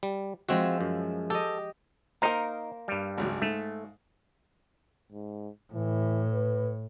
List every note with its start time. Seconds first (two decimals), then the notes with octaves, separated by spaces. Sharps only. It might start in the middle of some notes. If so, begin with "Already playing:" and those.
0.03 G3
0.49 F3 G#3 C4 F#4 E5
0.81 F#2
1.30 G4 A4 D#5
2.22 A#3 D#4 A#4 C5 F5 C6
2.88 G2 G3
3.17 G#1 C#2 F#3
3.42 G#2 A3
5.12 G#2
5.73 A2 E3
6.33 B4